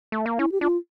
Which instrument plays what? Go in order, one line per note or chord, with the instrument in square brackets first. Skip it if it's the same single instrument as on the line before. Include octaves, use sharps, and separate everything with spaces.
[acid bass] A3
A#3
[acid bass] C#4 [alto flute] E4
[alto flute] G4
[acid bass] D4 [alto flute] F4